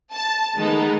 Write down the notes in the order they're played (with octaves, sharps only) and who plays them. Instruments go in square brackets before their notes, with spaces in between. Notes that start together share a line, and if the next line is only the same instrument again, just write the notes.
[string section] A5
D#3 G#3 A3 B3 D#4